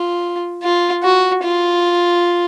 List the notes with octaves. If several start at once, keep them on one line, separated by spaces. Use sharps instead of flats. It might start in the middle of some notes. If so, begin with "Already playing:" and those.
Already playing: F4
F4
F#4
F4